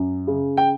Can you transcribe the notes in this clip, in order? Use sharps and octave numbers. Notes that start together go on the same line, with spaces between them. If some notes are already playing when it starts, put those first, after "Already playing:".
Already playing: F#2
C#3
G5